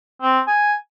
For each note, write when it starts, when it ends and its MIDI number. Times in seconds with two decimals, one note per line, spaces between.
0.22 0.40 60
0.47 0.75 80